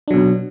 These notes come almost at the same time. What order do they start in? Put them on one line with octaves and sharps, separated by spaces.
D4 F#3 B2